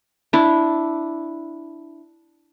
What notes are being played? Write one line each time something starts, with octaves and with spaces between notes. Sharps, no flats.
D4 E4